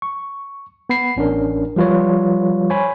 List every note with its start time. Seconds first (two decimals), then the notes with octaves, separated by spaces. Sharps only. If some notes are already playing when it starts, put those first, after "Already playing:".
0.02 C#6
0.90 B3 B5 C7
1.16 A1 C#4 D4 A#4
1.76 F3 G3 F4 B4 C#5
2.70 C5 C#5 G#5 B5